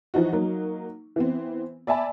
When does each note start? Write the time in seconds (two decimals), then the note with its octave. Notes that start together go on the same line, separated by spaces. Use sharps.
0.14 E3 F3 D#4 F#4
0.33 F#3 A#3 D#4
1.16 E3 B3 C4
1.87 D5 E5 G#5 A5 B5